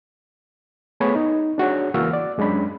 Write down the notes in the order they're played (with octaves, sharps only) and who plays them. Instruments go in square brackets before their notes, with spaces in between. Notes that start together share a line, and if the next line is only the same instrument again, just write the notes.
[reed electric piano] A3 B3 G#4 C#5 B5
D#4
D4 F#4 G#4 C#5
C#2 E3 A#3 F#4 E6 F6
D5
F#2 G#3 C#4 D4 B5